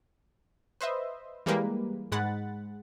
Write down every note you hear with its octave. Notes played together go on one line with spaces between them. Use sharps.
B4 C5 D#5 E5
E3 G3 G#3 A#3 B4
G#2 G#3 F#5 B5 A6